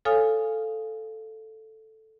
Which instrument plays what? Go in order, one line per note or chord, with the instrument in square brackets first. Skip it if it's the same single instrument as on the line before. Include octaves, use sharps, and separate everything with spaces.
[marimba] A4 C#5 F5 G#5 D#6 F6